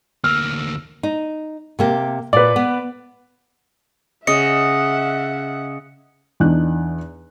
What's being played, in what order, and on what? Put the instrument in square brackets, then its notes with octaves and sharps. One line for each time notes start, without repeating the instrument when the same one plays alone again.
[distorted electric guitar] D2 A#3 [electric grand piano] E6 F6
[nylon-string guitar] D#4
C3 A#3 G4
[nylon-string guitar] A#2 [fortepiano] B4 D5
[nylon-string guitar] B3
[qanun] C#3 [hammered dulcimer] D#5 [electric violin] E5 F#5 [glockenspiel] C#7
[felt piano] E2 D4 D#4 F#6